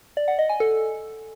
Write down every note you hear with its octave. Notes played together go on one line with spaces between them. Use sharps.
D5
F#5
D#5
G#5
A4